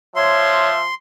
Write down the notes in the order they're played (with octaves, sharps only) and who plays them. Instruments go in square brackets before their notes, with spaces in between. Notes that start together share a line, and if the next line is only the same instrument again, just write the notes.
[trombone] F3 [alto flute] C#5 [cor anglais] E5 [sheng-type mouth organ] C6